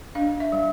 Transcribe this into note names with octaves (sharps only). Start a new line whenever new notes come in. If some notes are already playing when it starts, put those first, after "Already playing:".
D4 F5
E5
G3